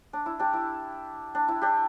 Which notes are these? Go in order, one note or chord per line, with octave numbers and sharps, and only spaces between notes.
D4
E4
D4 G4
E4
D4
E4
D4 G4